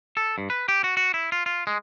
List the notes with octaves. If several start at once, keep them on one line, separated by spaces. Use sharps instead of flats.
A4
G2
B4
G4
F#4
F#4
E4
F4
F4
G#3